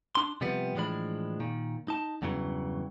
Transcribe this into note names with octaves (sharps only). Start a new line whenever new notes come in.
D4 C6
C3 F3 G3 B3
A2 E3 F3 G#3 D4 B5
A#2 D#3
D#4 A5
E2 G2 C#3 E3 F#3